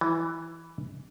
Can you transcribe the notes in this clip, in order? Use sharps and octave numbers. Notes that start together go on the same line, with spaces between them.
E3